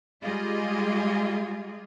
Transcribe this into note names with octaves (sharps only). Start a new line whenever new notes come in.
G3 G#3 F4 G4 G#4 D#5